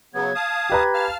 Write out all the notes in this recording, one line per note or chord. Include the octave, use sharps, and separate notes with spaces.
C#3 F#3 B3 G#6
F5 A5 D#6
G4 B4 A#5
F5 A5 F6